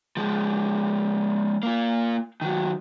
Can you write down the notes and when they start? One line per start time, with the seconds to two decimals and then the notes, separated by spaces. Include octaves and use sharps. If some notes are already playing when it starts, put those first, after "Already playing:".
0.17 F3 G#3
1.63 A#3 F4
2.41 D#3 F#3